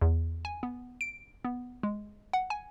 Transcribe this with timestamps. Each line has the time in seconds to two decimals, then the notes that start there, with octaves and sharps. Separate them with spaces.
0.01 E2
0.45 G#5
0.63 B3
1.01 D7
1.45 B3
1.83 G#3
2.33 F#5
2.50 G#5